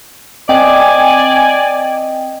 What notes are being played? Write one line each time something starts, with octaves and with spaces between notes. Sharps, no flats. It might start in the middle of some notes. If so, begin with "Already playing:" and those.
C4 D5 D#5 G5 G#5